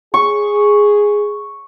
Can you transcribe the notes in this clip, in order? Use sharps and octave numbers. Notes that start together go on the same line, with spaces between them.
G#4 C#6